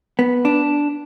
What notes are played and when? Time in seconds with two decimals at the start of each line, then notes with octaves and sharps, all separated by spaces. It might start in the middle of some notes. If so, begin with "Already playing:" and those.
0.19 B3
0.45 D4